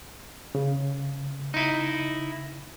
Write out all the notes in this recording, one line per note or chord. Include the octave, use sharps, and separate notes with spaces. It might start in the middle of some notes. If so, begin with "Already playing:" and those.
C#3
D#4 E4